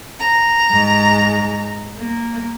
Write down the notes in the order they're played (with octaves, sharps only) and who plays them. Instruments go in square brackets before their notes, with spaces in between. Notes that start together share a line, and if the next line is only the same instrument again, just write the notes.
[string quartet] A#5
[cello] G#2
A#3